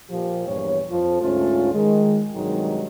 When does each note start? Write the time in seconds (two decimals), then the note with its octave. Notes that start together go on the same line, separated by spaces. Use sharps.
0.10 A#2 F3 G4
0.48 E2 G2 A#2 C#5
0.90 F2 F3
1.22 D2 G#2 A3 C#4 F4
1.73 D#3 G#3
2.34 G2 C3 D#3 F#3 G#3 D#4